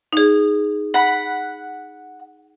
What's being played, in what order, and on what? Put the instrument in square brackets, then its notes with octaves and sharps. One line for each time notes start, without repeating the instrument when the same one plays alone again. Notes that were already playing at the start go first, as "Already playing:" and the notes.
[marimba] D#4 G#4
[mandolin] F#5 B5